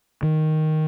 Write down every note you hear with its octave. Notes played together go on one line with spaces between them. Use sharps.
D#3